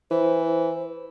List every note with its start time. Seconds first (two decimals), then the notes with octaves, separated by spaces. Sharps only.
0.11 E3 C5